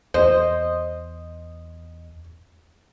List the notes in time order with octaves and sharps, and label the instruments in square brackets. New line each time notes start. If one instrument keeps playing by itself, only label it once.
[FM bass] E2 [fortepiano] C5 [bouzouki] D#5